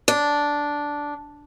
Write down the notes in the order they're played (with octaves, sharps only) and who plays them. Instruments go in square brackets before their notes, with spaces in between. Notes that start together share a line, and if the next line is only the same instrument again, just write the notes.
[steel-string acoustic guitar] D4